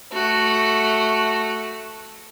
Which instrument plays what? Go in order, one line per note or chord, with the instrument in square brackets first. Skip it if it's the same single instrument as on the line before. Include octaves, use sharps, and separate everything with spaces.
[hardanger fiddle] A3 F#4